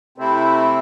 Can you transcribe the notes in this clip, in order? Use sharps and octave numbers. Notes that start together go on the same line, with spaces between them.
C3 A3 C4 E4